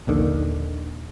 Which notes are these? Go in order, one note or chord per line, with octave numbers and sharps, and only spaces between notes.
A#1 D#2 D3 D#3